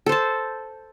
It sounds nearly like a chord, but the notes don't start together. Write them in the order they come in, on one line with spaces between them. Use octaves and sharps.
A4 C5 A5